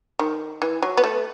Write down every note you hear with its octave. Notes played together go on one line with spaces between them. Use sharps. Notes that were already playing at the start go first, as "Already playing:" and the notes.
D#3
E3
F#3
B3
A3